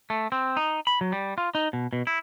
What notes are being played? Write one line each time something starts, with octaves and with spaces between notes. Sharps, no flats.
A3
C4
D#4
B5
F#3
G3
F4
D#4
B2
B2
E4